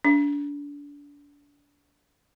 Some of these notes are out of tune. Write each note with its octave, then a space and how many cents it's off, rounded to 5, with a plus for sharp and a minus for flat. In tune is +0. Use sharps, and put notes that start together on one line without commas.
D4 -30